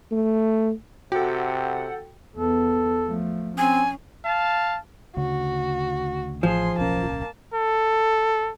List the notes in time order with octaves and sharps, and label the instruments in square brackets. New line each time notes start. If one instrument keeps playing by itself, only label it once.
[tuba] A3
[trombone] C3 [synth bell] F#4 [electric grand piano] A4 G5 [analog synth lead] F#5
[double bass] E2 B3 [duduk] A4
[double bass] F3 A3
[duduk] C4 [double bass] C#4 [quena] G#5
[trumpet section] F5 A5
[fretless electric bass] D2 C#3 [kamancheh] F#4
[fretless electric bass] A1 [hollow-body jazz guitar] F3 [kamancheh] G#4 C6
[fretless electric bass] D1 B1 C#4 [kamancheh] A#3 A5
[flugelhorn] A4